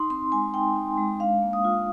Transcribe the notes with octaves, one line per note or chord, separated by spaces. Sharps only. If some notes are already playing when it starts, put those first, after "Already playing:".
Already playing: D#4 C6
C4 C6
G#3 G#5
D#4 G5
D#4
G#3
D4 F5
A#3
D#6
F4